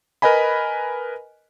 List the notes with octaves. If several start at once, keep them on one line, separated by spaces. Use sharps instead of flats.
A#4 B4 D#5 G#5 B5